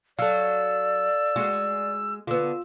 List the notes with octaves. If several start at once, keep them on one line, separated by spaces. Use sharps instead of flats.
F#3 A4 D5 F5 E6
G#3 F#4
D3 B3 F4 E6